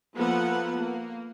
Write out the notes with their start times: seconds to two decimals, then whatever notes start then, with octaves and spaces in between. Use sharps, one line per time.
0.16 F3 A#3 B3 A4 F#5
0.79 A#3